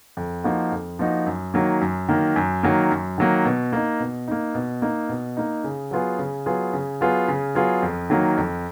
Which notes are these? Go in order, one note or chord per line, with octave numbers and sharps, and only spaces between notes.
F2
F3 A#3 D#4 F#4
F2
F3 A#3 D#4 F#4
F#2
D#3 F#3 A#3
F#2
D#3 F#3 A#3
F#2
D#3 F#3 A#3
F#2
D#3 F#3 A#3
B2
A#3 D#4
B2
A#3 D#4
B2
A#3 D#4
B2
A#3 D#4
C#3
F#3 B3 F4 G#4
C#3
F#3 B3 F4 G#4
C#3
F#3 B3 F4 G#4
C#3
F#3 B3 F4 G#4
F2
D#3 F#3 A#3
F2